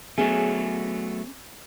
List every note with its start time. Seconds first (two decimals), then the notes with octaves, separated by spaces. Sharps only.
0.18 F#3 A3 B3 C#4 G#4